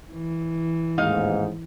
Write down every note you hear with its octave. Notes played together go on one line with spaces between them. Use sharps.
E3
A1 D#2 G#2 D#4 F5